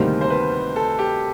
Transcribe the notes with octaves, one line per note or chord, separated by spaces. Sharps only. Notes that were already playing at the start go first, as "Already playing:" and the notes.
Already playing: D2 C3 D#3 G3 A#3 C5
C5
B4
A4
G4